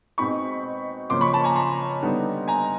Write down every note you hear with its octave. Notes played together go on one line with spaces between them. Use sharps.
B2 G#3 C4 D#4 B5 C#6
C#3 F3 A#3 C6 D6
B5 C#6
A5 B5
G#5 A#5
A#5 C6
D3 G3 B3 D#4
G#5 A#5